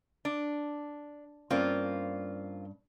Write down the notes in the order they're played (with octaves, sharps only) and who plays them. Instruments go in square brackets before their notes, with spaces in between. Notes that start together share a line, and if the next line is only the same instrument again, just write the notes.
[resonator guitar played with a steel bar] D4
[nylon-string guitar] G2 C#4 D5 [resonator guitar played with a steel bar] A#3 C4 F4